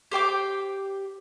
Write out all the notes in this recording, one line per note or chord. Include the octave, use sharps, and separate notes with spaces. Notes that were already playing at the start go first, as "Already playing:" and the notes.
G4 C5 G5 D6